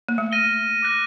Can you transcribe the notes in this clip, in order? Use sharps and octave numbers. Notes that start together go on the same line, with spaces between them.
A#3
A3
F6 A#6 D#7 G7
D6 F#6 A#6